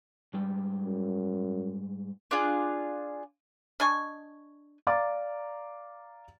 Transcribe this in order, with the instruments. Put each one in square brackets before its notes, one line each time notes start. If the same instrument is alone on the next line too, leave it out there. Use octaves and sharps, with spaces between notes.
[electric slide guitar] G#2 G3 G5
[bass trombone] F#2
[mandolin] D4 F4 G#4
[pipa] D4 D#5 G#5 C#6
[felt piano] D5 F5 A#5 D6 A6